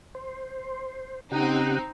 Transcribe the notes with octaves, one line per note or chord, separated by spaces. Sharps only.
C5
C#3 C4 D#4 G4 F#5